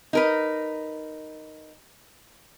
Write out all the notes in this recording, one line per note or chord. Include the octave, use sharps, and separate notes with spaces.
D#4 A#4 B4